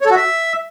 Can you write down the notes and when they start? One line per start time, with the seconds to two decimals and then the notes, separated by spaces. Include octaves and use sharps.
0.01 C#5
0.06 A4
0.11 F#4
0.16 E5